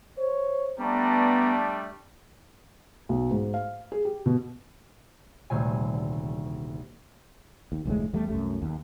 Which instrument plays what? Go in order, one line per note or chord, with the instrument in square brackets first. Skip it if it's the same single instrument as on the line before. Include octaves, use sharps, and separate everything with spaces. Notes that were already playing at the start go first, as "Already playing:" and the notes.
[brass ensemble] C5 C#5
[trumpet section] G3 A3 D4 [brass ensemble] B3 A#5
[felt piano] B1
G#2
F5
G#4
G4
B2
[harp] D#1 D2 C3 G#5
[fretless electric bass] D#2
F1 D2 A2 G#3
E2 G3 A3
C2 F#2 A3
D#2